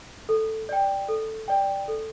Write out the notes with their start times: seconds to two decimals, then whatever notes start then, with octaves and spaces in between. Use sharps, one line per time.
0.29 A4
0.69 D5 G5
1.09 A4
1.48 D5 G5
1.88 A4